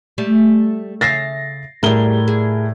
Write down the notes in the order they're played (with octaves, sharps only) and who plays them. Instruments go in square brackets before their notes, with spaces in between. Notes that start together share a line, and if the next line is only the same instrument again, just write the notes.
[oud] G3 A3
[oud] C#3 E5 F5 [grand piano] A6 A#6 C7
[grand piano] A2 A#4 G7 [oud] G3 G#4
[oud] G#4